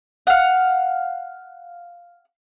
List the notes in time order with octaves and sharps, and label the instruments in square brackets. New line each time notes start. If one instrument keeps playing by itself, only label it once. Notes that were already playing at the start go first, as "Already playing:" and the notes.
[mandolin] F5 F#5